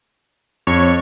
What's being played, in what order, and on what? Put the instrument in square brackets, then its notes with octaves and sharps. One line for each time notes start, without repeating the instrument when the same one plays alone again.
[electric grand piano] F2 [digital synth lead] C#5